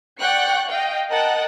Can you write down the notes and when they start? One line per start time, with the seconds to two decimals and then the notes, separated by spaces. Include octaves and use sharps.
0.20 D5 F#5 G5 C#6 F#6 C#7
0.68 D#5 F5 G5
1.11 A#4 D#5 F#5 G5 A5 F#6